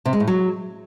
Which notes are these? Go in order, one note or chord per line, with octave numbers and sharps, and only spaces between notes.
C3
G#3
A2
F#3